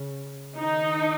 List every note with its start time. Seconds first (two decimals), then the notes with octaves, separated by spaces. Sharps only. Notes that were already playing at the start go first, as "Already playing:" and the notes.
Already playing: C#3
0.59 D#3 D#4